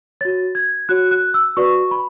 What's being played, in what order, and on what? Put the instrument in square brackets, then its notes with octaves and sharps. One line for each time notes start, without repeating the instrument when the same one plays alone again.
[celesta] F#4 C#5 A6
G#6
F#4 C#5 F#6
F#6
E6
F#4 B4 D5 C#6
B5